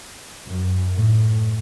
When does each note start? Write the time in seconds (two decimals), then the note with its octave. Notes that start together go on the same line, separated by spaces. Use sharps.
0.48 F#2
0.95 A2